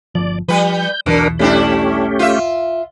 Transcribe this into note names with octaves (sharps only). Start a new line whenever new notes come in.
G1 F3 D5
F3 G3 B4 G6
B1 E2 B2 E3 D4 A#4
G3 A3 C#4 D4 E4 G4
F4 E5